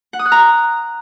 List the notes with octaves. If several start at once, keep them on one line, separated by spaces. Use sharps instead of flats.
F#5
D#6
F#6
A#5